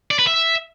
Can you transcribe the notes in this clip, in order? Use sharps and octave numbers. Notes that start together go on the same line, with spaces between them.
D5
B4
E5